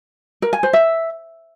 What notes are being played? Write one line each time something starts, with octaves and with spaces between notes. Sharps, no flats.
A#4
G#5
C5
E5